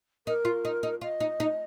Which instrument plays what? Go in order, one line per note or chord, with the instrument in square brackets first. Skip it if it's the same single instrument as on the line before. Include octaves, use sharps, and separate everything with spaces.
[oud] D#4 [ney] A#4
[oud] F4
D#4
D#4
[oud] F4 [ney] D#5
[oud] D#4
D#4